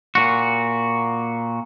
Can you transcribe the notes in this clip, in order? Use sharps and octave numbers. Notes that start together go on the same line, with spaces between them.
A#2 F#4